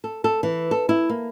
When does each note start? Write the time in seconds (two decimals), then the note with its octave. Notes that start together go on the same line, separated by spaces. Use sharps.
0.04 A4
0.24 A4
0.43 E3
0.71 A4
0.89 E4
1.09 A#3